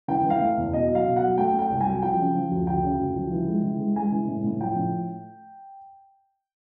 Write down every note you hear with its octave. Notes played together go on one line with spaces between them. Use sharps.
E3 G5
E3
F5
A3
E2
B2 D#5
F#3
F5
B2
F#3 F#5
A3 G5
A3
G5
C2
G#5
F#3
F3 G5
C#3
F3
D2
D2 G5
C#3
D2
F3
E3
G#3
E3
G#3
G#3 G#5
E3
A2
A2
F3 G5
A2